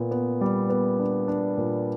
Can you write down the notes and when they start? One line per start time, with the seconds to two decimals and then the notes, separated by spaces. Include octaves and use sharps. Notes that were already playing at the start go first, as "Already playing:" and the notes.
Already playing: A#2 B3
0.11 B3
0.41 G3
0.70 B3
0.99 D4
1.28 D4
1.57 A#2